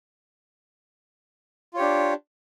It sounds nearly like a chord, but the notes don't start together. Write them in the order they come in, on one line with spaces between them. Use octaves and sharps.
F4 C#5 G4 D4